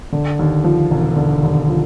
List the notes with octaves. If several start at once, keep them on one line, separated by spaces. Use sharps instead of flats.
D3
D#2
F3
E1
D3
D#2
F3